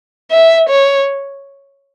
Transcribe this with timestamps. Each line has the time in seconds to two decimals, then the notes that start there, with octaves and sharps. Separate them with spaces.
0.31 E5
0.69 C#5